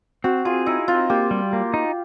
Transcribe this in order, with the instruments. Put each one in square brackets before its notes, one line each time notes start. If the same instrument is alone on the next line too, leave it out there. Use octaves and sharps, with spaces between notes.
[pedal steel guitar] C4 [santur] F#4
[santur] F4 [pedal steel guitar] G#4
[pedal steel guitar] D#4 [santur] E4
[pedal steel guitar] C4 [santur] F4
[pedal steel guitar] A#3 [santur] G4
[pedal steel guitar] G3
A#3
D#4